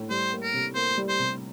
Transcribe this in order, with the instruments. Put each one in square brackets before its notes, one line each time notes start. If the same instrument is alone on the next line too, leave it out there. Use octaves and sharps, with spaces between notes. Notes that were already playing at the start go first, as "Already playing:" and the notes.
Already playing: [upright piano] A2
[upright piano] G3 [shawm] C5
[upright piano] A#3
[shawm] A#4
[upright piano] C3
[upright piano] A#3 [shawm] C5
[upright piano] G3
[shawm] C5
[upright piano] C3